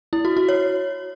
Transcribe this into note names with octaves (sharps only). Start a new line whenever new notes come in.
E4
F#4
F#4
C#5